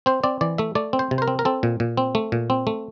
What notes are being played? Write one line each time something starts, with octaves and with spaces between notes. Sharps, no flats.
C4 C5
C4 D5
E3 D5
A3 E5
A3 D5
C4
C5
C3
C5
A#4
C4
A#4
C4 A4
A#2
A#2
C4
A3
A#2
C4
A3